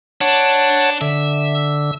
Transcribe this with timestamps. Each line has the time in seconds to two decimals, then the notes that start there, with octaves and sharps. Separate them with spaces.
0.21 D4 C#5 F#5 A5
1.01 D3 E5